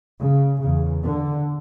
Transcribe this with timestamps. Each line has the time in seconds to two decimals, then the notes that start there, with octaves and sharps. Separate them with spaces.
0.20 C#3
0.62 E2 C#3
1.04 D3